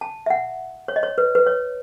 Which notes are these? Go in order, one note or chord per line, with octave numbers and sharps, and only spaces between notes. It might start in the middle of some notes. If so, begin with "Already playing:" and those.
A5
E5
F#5
C#5
D#5
C#5
B4
B4
C#5